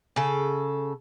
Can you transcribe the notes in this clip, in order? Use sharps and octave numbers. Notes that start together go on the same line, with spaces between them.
C#3 A4